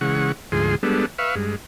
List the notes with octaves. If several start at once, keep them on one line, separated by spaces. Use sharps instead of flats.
C#3 E3 G#3 F#5 C#6
D2 G#2 F3 G#4 C6
G3 G#3 B3 D4 A4
B4 E5 F5 C#6
G2 G#3